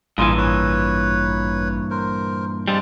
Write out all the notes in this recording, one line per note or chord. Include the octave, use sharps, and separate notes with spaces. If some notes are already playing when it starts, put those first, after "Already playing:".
A1 G2 A#2 E3 F4 G#4 F5
B4 C#5
A#4 C5
G2 G3 G#3 C4 A5